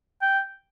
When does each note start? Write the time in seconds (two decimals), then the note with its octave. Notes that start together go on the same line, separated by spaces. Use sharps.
0.22 G5